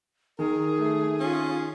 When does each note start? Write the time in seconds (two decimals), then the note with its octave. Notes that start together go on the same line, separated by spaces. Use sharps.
0.39 D#3 G#4 A#4
0.76 A3
1.20 C#4 F4